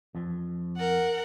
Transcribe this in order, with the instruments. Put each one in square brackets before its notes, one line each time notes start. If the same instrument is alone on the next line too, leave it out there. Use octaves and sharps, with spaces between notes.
[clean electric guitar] F2 F3
[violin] A#4 F#5